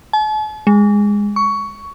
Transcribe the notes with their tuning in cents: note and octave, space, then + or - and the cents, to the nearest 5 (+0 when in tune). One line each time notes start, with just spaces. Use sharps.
A5 -45
G#3 -15
C#6 +15